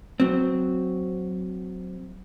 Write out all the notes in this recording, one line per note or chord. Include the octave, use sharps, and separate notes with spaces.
F#3 C4